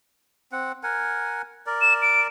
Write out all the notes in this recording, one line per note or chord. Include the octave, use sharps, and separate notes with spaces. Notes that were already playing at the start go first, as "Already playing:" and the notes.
C4 F#5
A#4 F#5 G#5
A#4 D5
E7
D7